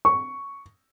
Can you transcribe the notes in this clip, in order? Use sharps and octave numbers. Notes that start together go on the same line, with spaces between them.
C#6